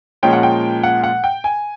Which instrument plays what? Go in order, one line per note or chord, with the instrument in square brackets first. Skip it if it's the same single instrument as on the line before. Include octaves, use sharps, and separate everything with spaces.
[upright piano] A#2 F3 G#3 C#4 G5
F#5
G5
F#5
F#5
G5
G#5